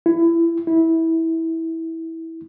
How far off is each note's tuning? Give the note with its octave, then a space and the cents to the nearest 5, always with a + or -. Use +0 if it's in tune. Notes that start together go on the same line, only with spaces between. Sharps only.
E4 +25
E4 -15